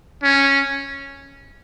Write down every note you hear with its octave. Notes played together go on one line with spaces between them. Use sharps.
C#4